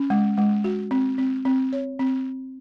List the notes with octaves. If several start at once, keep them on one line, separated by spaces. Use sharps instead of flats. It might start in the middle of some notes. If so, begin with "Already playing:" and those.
Already playing: C#4
G#3
G#3
F#4
C4
C4
C4
C#5
C4